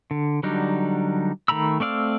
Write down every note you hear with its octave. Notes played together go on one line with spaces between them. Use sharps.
D3
D3 F#3 G3 D4 D#4
D#3 A3 A#5 B5 E6
A3 C4 D5 F5 E6